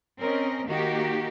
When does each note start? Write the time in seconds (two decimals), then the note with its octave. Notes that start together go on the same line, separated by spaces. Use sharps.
0.19 C4 C#4 A#4 D#5
0.66 D#3 A#3 D#4 F#4 G4